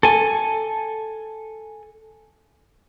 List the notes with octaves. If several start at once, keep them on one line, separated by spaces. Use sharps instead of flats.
A4 G#5